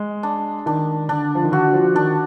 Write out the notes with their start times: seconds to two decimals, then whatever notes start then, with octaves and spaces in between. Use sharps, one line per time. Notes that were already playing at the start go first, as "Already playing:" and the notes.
Already playing: G#3
0.23 D4
0.66 D#3 D4
1.09 D3 D4
1.35 F3
1.44 D#3
1.52 D3 F#4
1.73 F3
1.95 D#3 D4